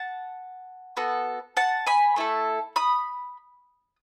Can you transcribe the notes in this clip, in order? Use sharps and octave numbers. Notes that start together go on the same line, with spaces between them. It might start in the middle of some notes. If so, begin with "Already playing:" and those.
Already playing: F#5 A5
B3 F#4 A4
F#5 A5
G#5 B5
A3 E4 A4
B5 D#6